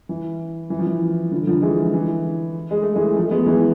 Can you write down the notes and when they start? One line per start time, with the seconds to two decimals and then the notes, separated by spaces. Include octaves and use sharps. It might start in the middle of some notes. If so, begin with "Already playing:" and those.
0.09 E3
0.70 E3
0.79 F3
0.86 E3
1.31 D3 F3
1.47 D3 F3
1.62 E3 G#3
1.94 E3
2.71 G#3
2.82 A3
2.95 E3 G#3
3.16 F3 A3
3.31 G#3 B3
3.46 E3 G#3